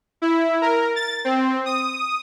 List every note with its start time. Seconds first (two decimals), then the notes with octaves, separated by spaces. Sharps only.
0.22 E4
0.62 A#4
0.96 A6
1.25 C4
1.65 D#6